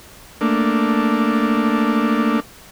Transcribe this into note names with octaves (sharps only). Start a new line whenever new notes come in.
A3 A#3 D4